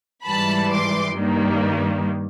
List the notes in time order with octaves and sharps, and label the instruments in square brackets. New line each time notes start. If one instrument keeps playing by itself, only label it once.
[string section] G#2 E3 G3 A5 B5
C6 D6
G2 D#3 G3 A#3